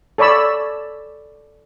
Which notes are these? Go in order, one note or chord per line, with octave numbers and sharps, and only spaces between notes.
A4 C#5 D5 B5 E6